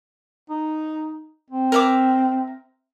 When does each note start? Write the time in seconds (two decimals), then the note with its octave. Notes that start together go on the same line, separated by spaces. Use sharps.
0.50 D#4
1.50 C4
1.72 A#4 E5 D6